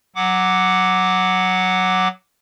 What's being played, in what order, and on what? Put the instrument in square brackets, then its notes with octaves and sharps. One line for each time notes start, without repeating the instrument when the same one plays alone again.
[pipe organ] F#3 F#5 D6